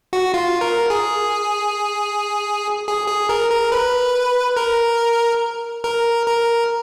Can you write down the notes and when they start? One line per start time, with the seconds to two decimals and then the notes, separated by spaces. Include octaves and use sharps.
0.13 F#4
0.34 F4
0.61 A#4
0.90 G#4
2.88 G#4
3.08 G#4
3.29 A#4
3.51 A#4
3.72 B4
4.57 A#4
5.84 A#4
6.26 A#4